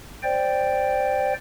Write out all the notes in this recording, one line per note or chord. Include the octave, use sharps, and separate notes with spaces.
C5 D5 G5